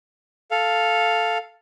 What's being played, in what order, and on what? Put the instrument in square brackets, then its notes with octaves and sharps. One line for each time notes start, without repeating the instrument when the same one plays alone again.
[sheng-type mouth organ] A4 F5